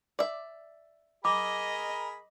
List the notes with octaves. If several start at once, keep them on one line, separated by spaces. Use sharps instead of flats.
D5 E5
G#4 A#4 D#5 B5 D6